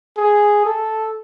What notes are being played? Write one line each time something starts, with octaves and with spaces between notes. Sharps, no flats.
G#4
A4